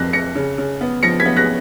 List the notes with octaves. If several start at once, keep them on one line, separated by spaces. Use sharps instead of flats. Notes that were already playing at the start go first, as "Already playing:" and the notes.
Already playing: F2 F3 F#6 A#6
F2 A#6 C#7
C#3
C#3
B3
F3 A#6 C#7
G#6 B6
B3
F#6 A#6